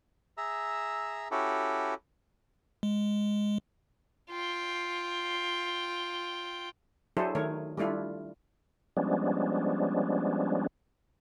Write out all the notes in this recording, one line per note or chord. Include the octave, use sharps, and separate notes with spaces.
G#4 E5 A#5 E6
C#4 E4 F#4 G4 A4
G#3
F4 G5
F#3 D4 E4 G#4 A4 C5
D#3 A3 A#4 C#5
G3 A3 D4 E4 F4
F3 G3 G#3 B3 C#4 D4